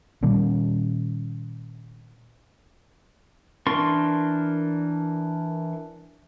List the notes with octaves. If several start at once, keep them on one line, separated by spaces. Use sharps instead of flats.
A#2 D#3 G3 C#4
E3 D4 A#4 C6 C#6